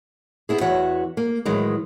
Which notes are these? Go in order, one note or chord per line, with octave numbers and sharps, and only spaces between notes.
B3 E4 G#4
E2 E3 F#4 C#5 E5 F#5
A#3
A2 D#3 E3 F#3 G#3